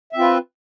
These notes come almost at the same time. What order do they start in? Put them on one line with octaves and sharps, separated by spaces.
E5 C4 F4 B4